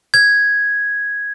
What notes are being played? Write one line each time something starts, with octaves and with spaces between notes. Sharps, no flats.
G#6